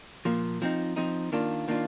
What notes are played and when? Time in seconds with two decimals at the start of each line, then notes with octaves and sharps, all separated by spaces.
0.25 A#2 F3 A#3
0.62 F3 C4 D#4
0.96 F3 C4 D#4
1.32 D#3 A#3 D4 F4
1.68 D#3 A#3 D4 F4